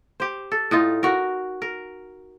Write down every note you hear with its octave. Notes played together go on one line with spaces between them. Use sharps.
G4 C5
A4
A2 D#4 F4
F#4 A#4
A#4